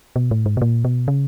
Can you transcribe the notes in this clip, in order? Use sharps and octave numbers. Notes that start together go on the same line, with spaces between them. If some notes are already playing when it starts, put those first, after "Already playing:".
B2
A2
G#2
B2
A#2
B2
C#3